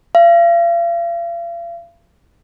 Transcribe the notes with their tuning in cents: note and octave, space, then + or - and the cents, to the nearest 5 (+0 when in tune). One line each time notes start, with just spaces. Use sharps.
F5 -40